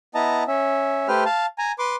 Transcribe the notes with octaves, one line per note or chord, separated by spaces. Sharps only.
B3 E4 D#5 A5 A#5
C#4 E5
A3 G4 B4 C5 F6
F5 A5
G#5 A#5
B4 C6 D6